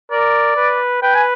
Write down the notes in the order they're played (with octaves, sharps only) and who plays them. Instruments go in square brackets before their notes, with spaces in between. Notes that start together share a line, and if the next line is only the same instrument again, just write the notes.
[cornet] A#4 [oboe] D5
[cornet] B4
[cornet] B4 [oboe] G5
[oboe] G#5